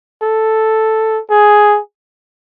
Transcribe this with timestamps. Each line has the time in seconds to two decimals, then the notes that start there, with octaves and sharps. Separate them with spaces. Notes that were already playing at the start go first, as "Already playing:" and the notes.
0.23 A4
1.30 G#4